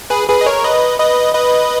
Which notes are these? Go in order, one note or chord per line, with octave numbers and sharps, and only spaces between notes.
G#4 B4
G#4 B4
D#5
A#4 C#5
B4 D#5
B4 D#5
B4 D#5